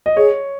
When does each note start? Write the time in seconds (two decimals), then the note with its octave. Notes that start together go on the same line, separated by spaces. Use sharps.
0.06 D#5
0.16 G#4 C#5